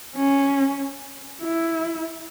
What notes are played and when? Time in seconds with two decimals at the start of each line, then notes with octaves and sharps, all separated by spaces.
0.16 C#4
1.42 E4